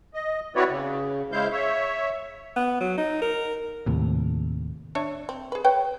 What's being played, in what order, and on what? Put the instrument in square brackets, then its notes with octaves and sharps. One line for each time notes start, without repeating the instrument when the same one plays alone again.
[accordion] D#5
C4 E4 F#4 B4 C#5 D5
C#3
C#3 G#3 E4 C5 F5 G6
C#5 E5
[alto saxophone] B3
F#3
D#4
A#4
[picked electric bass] D#2 A2 C3
[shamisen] D4 C#5 E5
C4
G#4 B4
B4 C#5 G5